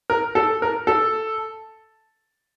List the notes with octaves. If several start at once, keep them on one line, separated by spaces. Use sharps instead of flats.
A#4
A4
A#4
A4